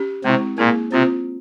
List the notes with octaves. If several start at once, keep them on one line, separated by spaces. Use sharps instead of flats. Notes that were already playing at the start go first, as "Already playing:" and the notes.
Already playing: C#4 G4
C3 G#3 C4 E4
A#2 A#3 E4 G#4
C3 C4 F4 C5